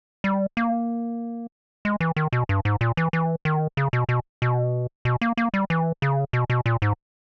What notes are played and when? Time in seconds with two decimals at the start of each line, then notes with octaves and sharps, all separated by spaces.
0.24 G3
0.57 A#3
1.85 G#3
2.01 E3
2.16 D#3
2.33 B2
2.49 G2
2.65 G#2
2.81 A#2
2.97 E3
3.13 E3
3.45 D#3
3.77 C#3
3.93 B2
4.09 B2
4.42 B2
5.05 B2
5.21 A#3
5.37 A#3
5.54 G3
5.70 E3
6.02 C#3
6.33 B2
6.50 B2
6.66 A#2
6.82 G#2